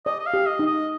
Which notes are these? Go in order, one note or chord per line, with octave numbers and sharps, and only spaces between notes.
D5 D#5
D#5
F5
G4
D#5
D#4
D#5